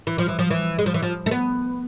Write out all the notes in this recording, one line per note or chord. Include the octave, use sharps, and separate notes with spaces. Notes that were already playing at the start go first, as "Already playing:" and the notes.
E3
F3
E3
F3
E3
G#3
F3
E3
F3
A3
B3